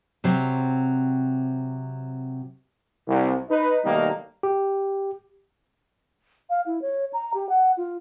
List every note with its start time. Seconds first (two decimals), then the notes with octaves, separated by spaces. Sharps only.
0.24 C3 F#3 C4
3.07 C2
3.50 D#4 B4
3.84 B2 D#3 G3 A3 A#3 D#4
4.43 G4
6.50 F5
6.66 E4
6.82 C#5
7.13 A#5
7.34 G4
7.49 F#5
7.77 F4